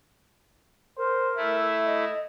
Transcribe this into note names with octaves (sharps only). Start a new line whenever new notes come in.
A#4 C5
A3 E4 E5
D#5